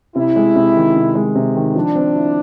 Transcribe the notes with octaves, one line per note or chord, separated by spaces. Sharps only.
C3 E4
G#3
C3
D#3
C3
G#3
C3
D#3
F3 D4
C4
E4